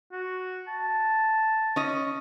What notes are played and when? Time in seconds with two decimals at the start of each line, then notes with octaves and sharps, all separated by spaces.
0.12 F#4
0.68 A5
1.76 C#4 D#5